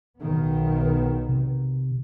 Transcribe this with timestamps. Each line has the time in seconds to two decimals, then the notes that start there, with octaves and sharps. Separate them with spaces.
0.18 B1 D#3 B3
1.29 C3